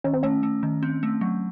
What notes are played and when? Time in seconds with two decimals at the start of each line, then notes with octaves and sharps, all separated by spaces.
0.04 D#3 C#4
0.14 C4
0.23 A3 C#4
0.43 A3
0.63 D#3
0.83 C4
1.03 A3
1.21 F#3